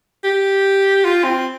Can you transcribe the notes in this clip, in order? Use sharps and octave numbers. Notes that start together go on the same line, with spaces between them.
G4
F4
C4